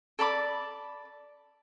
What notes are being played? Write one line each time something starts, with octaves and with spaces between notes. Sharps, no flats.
A4 D5 B5 D6